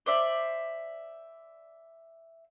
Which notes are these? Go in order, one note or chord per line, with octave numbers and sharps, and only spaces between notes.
C5 D5 E5